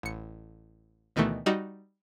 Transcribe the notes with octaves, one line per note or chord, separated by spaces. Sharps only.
A1 C#7
D2 B2 D#3 E3 A3
G3 D#4 F#4